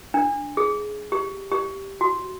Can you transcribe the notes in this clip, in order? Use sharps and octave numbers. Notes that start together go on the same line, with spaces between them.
D4
G#4
G4
G4
F#4